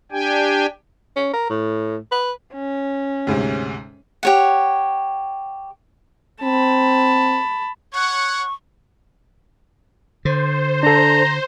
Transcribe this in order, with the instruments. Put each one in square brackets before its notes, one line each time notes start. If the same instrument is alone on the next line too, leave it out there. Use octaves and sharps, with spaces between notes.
[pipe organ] D4 G4 G5 G#5
[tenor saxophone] C#4
A#4
A2
B4
[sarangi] C#4
[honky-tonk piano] D2 G#2 C3
[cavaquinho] G4 C#5 F#5
[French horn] C4 [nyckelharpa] A5 B5
[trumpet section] C#5 F#5 [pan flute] C#6
[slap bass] D3 [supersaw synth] C5
[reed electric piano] D4 A4 [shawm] A#5